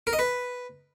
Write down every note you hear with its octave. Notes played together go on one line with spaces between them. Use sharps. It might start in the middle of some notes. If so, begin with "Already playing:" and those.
A#4
D#5
B4